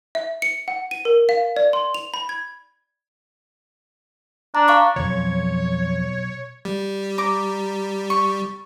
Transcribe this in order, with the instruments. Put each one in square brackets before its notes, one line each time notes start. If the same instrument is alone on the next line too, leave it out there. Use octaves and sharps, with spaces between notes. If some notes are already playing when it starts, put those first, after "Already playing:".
[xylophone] E5
C#7
F#5
D#7
A#4
F5
D5
C6
F7
B5
G#6
[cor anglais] D4 [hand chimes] A#5
[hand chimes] F5 C#6 D6
[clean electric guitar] B1 [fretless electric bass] F2 F3 [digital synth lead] C#5
[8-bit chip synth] G3
[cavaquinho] A#5 D6
C#6